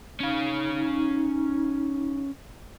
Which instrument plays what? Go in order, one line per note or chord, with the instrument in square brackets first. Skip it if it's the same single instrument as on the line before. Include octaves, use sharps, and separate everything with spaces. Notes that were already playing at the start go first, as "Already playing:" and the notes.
[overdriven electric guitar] C#4 F5 [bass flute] D#4